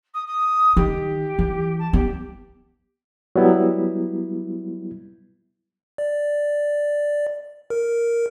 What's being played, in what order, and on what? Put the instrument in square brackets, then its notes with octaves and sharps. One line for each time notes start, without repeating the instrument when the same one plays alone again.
[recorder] D#6
D#6
[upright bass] D#3 [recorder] G4
[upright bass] E3
[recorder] A5
[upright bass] B3 [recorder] G4
[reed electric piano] F#3 G3 B3 E4
[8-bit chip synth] D5
A#4